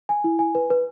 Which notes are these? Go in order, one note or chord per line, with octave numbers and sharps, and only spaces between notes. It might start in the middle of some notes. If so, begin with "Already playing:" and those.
G#5
E4
G#5
B4
B4